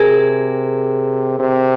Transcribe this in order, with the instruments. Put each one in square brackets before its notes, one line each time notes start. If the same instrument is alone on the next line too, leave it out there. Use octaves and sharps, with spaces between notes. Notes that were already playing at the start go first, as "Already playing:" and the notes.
Already playing: [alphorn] C3 [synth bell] G#4 A#4
[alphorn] C3